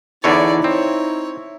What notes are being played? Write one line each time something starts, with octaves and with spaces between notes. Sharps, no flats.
E2 D3 D#4 E4 C#5 D5
C4 C#5